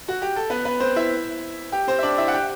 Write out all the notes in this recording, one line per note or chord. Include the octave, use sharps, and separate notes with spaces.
F#4
G4
A4
B3 B4
B3 B4
C4 C5
E4 E5
G4 G5
C4 C5
E5
D4 D5
E4 E5
F#5
G4 G5